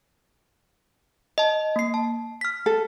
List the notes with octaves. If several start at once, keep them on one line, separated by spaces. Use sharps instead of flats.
D#5 A5
A#3 C7
A5
F6 B6
A4